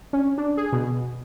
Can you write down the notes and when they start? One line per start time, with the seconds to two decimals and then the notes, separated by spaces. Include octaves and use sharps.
0.13 C#4
0.38 D4
0.57 G#4
0.73 B2